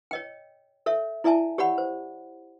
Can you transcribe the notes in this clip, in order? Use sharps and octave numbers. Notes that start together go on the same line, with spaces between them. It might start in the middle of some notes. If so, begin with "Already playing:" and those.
C#5 D#5 G5
A4 C#5 E5
E4 D5 E5 G#5 A5
G4 C#5 D5 F#5 B5
C5